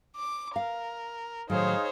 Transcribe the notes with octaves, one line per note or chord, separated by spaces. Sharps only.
D6
A#4 F5
A2 D#3 F#3 D#4 G#4 C5 C#5 F5